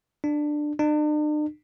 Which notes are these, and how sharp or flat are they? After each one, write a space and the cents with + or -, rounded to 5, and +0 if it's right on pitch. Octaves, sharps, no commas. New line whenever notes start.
D4 +15
D4 +45